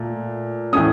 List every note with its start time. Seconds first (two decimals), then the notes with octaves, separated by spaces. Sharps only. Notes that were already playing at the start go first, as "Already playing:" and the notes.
Already playing: A#2 A3
0.73 A2 E3 A3 C#4 D#6